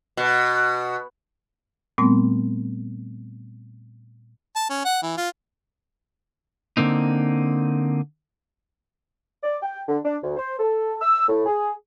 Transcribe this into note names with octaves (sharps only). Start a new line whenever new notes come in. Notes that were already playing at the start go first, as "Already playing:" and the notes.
B2
A#2 G3 A3 B3 C4
A5
C#4
F#5
E3
F4
D3 A#3 C4 D#4
D5
G5
D3
D4
D2
C5
A4
E6
A2
G#4